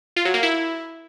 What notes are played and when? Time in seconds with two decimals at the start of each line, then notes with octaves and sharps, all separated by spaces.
0.16 F4
0.25 F#3
0.34 A#3
0.43 E4